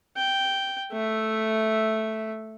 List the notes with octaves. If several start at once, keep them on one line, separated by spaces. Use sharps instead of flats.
G5
A3 E5